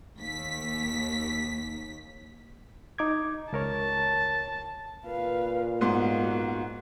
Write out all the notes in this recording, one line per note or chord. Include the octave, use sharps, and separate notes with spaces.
D#2 B6
D#4 D6 G#6
C#2 A#4 C#5 A5
A#2 B4 F5
G#2 B3 F#4 F5 C6